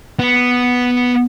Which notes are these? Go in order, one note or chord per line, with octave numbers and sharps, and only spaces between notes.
B3